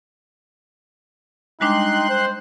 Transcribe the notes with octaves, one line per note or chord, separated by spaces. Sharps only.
G3 G#3 D4 D#4 G5 C6 F#6
C5